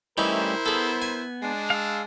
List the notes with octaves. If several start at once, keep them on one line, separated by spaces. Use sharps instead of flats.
E3 G3 A3 C#4 D#4 E4 A#4 C5
B3 G#4 A4
G#5
G#3 D4
F5 E6